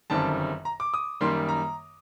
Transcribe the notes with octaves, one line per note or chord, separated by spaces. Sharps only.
G1 F#2 D#3 G3 C4 A5
A#5
D6
D#6
F#2 D#3 G3 A#3 C6
A#5